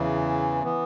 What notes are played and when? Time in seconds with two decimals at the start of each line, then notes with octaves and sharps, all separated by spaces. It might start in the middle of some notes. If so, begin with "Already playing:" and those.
Already playing: E2 C#3 E3
0.64 E3 B3